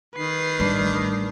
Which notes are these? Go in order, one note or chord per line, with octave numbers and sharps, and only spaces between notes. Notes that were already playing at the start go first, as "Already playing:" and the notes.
D#3 B4 C7
A1 G3 D4